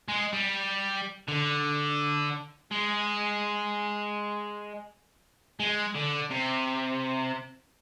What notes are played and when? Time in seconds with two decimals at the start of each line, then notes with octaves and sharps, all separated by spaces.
0.08 G#3
0.33 G3
1.28 D3
2.72 G#3
5.60 G#3
5.95 D3
6.31 C3